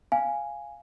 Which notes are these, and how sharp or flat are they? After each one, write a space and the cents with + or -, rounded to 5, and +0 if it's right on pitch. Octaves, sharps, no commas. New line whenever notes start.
F5 -5 G#5 +0